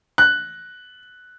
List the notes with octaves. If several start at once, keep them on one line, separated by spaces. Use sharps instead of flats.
F#6